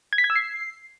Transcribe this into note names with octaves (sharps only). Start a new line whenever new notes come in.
G#6
B6
G#6
E6
C7